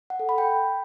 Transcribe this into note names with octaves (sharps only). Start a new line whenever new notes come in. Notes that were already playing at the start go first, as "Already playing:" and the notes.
F#5
A4
B5
G5